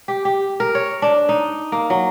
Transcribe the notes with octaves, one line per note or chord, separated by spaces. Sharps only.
G4
G4
A#4
C#5
D4
D#4
A#3
F#3